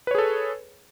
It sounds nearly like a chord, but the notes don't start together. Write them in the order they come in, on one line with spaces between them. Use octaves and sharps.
B4 C#5 G#4 A4